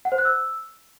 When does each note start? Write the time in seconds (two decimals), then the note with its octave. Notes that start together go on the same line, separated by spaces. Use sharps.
0.05 F#5
0.12 C5
0.18 F#6
0.25 E6